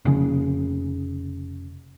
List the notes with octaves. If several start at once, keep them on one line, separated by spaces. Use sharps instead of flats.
F1 C#3